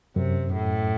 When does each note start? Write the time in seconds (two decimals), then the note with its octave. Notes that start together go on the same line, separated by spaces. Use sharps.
0.16 F#2 C3
0.53 A2